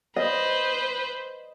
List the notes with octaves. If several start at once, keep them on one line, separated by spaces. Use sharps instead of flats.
B4 C5 D#5